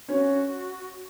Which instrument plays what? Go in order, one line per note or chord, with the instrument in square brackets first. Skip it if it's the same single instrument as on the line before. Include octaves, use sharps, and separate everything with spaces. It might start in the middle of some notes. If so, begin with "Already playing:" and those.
[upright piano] C#4 [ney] F#4